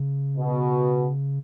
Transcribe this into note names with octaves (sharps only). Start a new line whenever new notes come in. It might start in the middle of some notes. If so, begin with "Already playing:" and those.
Already playing: C#3
B2